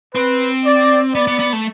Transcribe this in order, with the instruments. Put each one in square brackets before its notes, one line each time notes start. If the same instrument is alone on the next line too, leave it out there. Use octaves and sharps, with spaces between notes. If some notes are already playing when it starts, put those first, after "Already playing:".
[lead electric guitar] C4 [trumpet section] B4
[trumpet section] D5
[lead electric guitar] B3 [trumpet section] D5
[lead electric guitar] B3
B3
A3